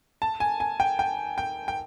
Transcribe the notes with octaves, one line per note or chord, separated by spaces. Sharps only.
A5
G#5
G#5
G5
G5
G5
G5